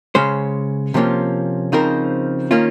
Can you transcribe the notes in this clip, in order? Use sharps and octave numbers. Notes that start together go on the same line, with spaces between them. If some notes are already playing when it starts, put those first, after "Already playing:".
C#3 G#3 C#4 C5
C3 F3 A#3 C#4 F4
C#3 F3 C4 D#4 A#4
D#3 A#3 C#4 F4